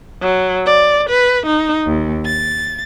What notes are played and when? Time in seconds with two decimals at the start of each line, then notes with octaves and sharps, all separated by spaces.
0.22 F#3
0.66 D5
1.10 B4
1.47 D#4
1.87 D#2
2.26 A6